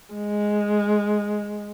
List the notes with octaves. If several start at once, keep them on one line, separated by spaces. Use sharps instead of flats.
G#3